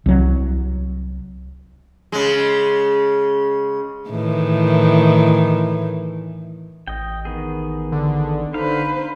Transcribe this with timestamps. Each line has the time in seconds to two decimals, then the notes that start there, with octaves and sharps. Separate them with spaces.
0.06 C2 F#3
2.12 C#3 G#3
4.10 A2 D#3 E3
6.88 A1 D#5 G5
7.25 D#3 B3 G#4
7.92 D3
8.54 D#4 B4 C5 F5